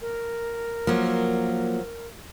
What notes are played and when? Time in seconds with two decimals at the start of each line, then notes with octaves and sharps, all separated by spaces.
0.01 A#4
0.87 F3 F#3 A#3